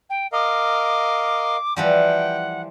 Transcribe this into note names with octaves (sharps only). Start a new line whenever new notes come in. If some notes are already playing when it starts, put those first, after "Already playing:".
G5
A#4 D#5 F5 D6
E3 F3 G3 F#5 G5